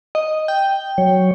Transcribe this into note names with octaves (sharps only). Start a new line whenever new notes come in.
D#5
G5
F#3 C#5